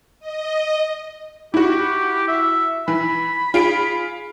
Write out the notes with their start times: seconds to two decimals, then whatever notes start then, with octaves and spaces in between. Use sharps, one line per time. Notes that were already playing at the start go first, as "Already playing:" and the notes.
0.19 D#5
1.54 E4 F#4 G4
2.28 E5
2.88 E3 B5
3.54 F4 G#4 D7